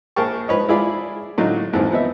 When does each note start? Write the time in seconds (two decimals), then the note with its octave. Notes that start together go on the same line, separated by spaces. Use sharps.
0.16 A#1 G#4 A#4 G5 A5 C#6
0.48 F3 B4 C#5 D#5
0.68 E4 F4 G#4 D5 B5
1.38 A2 D3 F#3 D#4 F4
1.73 A#1 F2 G#2 E3 F3
1.91 F3 B3 D#4 E5